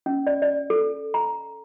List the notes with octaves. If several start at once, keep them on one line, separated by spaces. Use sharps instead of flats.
C#4
D5
D5
A4
A#5